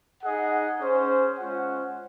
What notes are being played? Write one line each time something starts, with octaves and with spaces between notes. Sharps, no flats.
D#4 G#4 D#5 F#5
C#4 G#4 C5
G#3 C#4 F4 C5 F#5